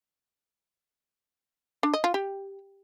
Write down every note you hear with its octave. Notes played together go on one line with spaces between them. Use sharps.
D4
D#5
F4
G4